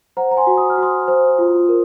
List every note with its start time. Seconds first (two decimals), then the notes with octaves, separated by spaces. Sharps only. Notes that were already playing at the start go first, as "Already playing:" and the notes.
0.17 C5 F#5 A#5
0.31 A#5
0.37 G#5 C6
0.47 F#4
0.57 D#6
0.70 F6
0.77 F#4
0.83 C6 D#6
1.08 C5
1.38 F4
1.69 A#4